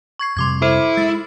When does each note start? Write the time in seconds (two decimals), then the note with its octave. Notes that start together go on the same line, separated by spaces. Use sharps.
0.19 C#6 G#6 C7
0.37 F2 C3 G3 C6 D6 G#6
0.62 E4 A4 C5
0.97 G#3 A6